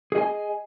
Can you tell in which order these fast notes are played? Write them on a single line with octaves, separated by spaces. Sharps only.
G#4 D#5 G#5